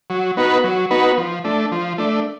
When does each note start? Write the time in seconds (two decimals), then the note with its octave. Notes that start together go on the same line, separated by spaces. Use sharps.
0.10 F#3
0.37 B3 D#4 F#4 B4
0.64 F#3
0.91 B3 D#4 F#4 B4
1.18 F3
1.44 A3 D4
1.72 F3
1.98 A3 D4